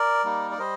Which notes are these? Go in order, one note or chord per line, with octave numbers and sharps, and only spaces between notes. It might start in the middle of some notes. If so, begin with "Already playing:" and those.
Already playing: A#4 D5
G3 A#3 D#4
D5
G3 C5 D#5